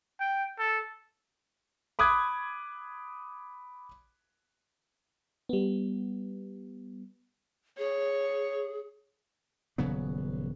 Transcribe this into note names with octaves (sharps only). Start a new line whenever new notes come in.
G5
A4
B5 D6 D#6 F#6 G#6
G3 B3
G#4 C#5
D#1 C#3 F#3 B3